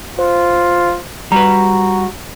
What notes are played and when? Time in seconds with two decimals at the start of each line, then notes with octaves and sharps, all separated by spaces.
0.19 F4 C5
1.32 G3 F#4 B4 A#5